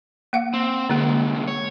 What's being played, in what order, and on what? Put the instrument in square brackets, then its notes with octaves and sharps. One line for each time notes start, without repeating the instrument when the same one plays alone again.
[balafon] A#3 F5 F#5
[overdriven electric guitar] C4
[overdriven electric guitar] C2 G#3 [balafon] D3 A#3
[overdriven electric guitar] C#5